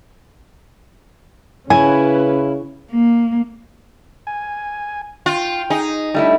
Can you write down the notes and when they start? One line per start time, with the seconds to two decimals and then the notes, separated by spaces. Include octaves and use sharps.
1.70 C#3 C#4 E4 B4 G#5
2.91 A#3
4.27 G#5
5.26 F4 G5
5.70 D#4 G#4
6.14 G3 A3 D4 E4